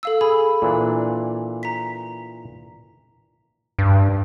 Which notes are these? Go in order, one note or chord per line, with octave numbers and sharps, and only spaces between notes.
A4 F5 E6
G#4 B5
A#2 E3 D4
A#5 B6
G2